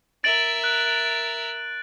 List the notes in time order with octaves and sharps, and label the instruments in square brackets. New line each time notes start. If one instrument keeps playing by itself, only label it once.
[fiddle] A#4 E5 [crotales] A6 D7 F#7
[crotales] F#6